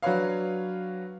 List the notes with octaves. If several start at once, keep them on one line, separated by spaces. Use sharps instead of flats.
F#3 D4 B4 C#5 F5